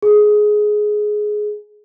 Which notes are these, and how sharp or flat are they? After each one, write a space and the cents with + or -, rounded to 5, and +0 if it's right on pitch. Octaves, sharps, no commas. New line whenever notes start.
G#4 +15